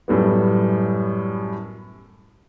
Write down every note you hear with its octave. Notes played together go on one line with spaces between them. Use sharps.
F#2 A2 G3 B3